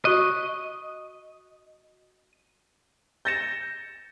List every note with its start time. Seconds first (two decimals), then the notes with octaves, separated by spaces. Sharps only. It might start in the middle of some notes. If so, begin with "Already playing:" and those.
0.05 F#4 D#5 C#6 F#6
3.25 G6 A6 A#6 C#7 E7